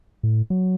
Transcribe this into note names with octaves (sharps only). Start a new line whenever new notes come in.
A2
F#3